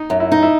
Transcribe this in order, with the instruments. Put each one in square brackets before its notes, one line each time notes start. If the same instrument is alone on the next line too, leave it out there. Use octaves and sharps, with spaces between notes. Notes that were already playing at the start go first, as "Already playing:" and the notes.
Already playing: [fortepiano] D#4
[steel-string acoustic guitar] F#2
[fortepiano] E4
[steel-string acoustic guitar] D#4
[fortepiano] E4